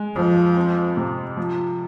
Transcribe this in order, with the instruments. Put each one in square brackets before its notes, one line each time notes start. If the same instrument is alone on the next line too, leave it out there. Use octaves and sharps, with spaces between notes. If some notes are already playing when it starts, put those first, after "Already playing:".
Already playing: [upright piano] G#3
[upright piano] F2 [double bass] F3
[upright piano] C4
C3
F3